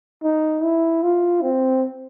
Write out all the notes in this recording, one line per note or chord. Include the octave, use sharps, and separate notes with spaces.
D#4
E4
F4
C4